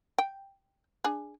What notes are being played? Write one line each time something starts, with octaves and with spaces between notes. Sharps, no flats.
G5
D4 G#4